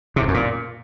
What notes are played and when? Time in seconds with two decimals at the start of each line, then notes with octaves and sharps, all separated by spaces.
0.16 C3
0.22 F2
0.28 F#2
0.34 A#2